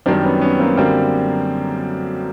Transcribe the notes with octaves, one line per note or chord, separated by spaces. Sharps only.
F#2 D#3 G3 C4 D4
B3 C#4
B3 C#4
A#3 C4
F#2 D3 G3 A#3 C4